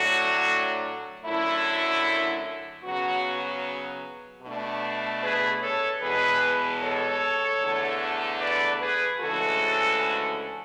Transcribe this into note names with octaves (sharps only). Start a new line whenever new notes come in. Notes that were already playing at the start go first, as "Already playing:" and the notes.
Already playing: A2 F#3 A3 D4 F#4
F#2 D3 F#3 A3 E4
C#3 F#3 B3 F#4
B2 A3 D4
G#4 B4
A4 C#5
E2 B2 G#3 G#4 B4
A4 C#5
E2 D3 A3
B4 D5
G#4 B4
D2 C#3 E3 G#3 F#4 A4